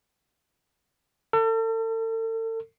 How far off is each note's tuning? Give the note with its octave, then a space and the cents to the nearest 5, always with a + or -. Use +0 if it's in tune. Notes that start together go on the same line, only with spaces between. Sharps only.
A4 +40